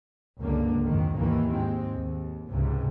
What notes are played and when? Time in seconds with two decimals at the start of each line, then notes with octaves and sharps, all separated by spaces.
0.40 C#2 G2 D3 A#3
0.85 F2 G#2 D#3
1.17 D#2 G#2 D#3 E3 A#3
1.53 G#2 G#3 C4
1.94 D#2
2.48 C#2 G#2 C3